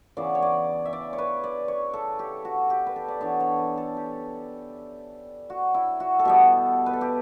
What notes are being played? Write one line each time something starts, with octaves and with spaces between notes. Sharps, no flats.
C#3 E3 B3 D5
C#5
D5
E5
D5
C#5
B4
D5
C#5
A4
G4
F#4
G4
B4
A4
D5
E3 B3 D4 C#5
C#5
B4
A4
G4
F#4
E4
F#4
A4
B2 G3 B3 G4
B4
A4
G4